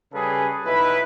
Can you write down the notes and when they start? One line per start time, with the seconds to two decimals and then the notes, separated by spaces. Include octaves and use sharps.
0.13 C#3 G3 G#4 A4 B4
0.65 B1 D#4 E4 B4